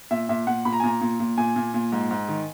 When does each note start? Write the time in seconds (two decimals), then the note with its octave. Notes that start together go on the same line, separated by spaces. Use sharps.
0.11 A#2 E5
0.29 A#2 E5
0.47 A#2 F#5
0.65 A#2 B5
0.73 A#5
0.80 G#5
0.83 A#2 A#5
1.01 A#2
1.20 A#2
1.38 A#2 G#5
1.56 A#2
1.74 A#2
1.92 G#2
2.11 G#2
2.28 D#3